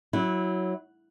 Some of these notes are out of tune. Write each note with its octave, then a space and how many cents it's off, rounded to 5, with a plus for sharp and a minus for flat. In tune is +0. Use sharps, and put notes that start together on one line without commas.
F#3 +0 E4 -15